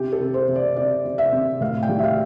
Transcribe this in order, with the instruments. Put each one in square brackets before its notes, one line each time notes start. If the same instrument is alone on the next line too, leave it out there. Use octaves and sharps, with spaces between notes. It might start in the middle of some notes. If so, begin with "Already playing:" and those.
Already playing: [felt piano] C3 G4
A4
C3
C5
C3
D5
C3 D5
C3
E5
C3
A2 F5
G5
G3
E5
F5